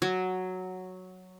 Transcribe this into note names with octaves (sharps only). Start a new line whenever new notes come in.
F#3